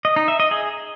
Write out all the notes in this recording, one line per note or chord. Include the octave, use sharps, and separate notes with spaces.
D#5
D#4
E5
D#5
G#4